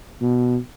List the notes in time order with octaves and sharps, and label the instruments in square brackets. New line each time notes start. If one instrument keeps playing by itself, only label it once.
[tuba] B2